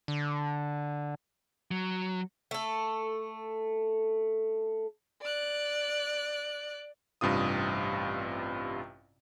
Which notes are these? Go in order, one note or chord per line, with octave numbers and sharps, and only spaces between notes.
D3
F#3
A3 A4
D5 F#6
A1 G2 C3 F4 D#6